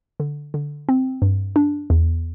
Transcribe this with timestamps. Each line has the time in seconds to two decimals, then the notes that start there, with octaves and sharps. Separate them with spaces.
0.20 D3
0.54 D3
0.89 C4
1.22 G2
1.56 D4
1.90 E2